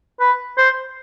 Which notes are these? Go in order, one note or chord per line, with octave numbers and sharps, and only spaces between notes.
B4
C5